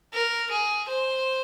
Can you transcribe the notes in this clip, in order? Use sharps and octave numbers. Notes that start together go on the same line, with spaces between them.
A#4
G#4
C5